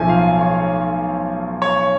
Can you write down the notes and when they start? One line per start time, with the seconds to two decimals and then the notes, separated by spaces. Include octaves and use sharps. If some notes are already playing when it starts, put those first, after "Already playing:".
Already playing: B1 A2 F3 A3 G#5
0.09 F5
0.41 C#5
1.62 C#5